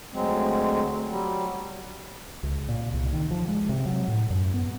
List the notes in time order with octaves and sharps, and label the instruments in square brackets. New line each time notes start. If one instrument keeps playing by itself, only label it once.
[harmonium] D2 F#3 G#3 C4
F#3 G3
[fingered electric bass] C#2
A#2
C2
D#3
F3
G#3
C3
F#3
A2
F#2
B3